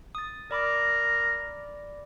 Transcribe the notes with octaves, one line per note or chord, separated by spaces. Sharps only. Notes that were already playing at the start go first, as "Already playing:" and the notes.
D#6 A6
A#4 D5 B5 D6